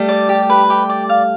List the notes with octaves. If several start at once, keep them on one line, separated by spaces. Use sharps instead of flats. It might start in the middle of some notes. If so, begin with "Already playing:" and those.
Already playing: G3 A3
D5
G4
B4
G4
D5
F5